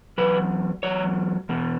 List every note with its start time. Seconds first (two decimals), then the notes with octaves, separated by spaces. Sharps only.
0.18 E2 B2 F#3 B4
0.83 E2 B2 F#3 C#5
1.49 E2 B2